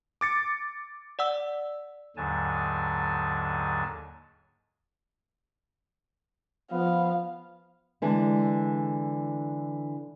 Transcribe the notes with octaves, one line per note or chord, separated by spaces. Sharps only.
D6 A6 C#7
D5 F#5 E6
D#2 G#2 D3 F#3 G#5 A5
F3 B3 F5
D3 E3 G#3